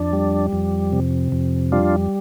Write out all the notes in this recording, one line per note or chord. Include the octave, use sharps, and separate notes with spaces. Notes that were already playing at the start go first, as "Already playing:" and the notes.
Already playing: F2 D4
G3
F2
C3
F2
G3 D4 F4